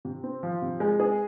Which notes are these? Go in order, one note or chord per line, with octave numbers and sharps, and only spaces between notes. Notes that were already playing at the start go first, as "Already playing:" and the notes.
C3
C4
F3
C3
G#3
G#4